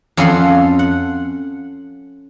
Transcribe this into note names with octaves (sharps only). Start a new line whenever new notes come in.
F2 C#4 F4 A4 F#5 C6
F#5